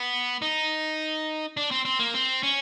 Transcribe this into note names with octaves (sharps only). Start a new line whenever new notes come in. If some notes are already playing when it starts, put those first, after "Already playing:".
Already playing: B3
D#4
D4
C4
C4
A#3
C4
C#4